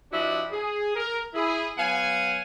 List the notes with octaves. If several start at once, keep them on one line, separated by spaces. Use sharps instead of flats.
F3 D4 E4 F#4 G4 D#5
G#4
A#4
E4 G#4
F#3 B3 F5 F#5 G#5